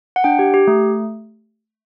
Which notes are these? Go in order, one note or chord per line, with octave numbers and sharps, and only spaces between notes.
F#5
D4 G5
G4
G4
A3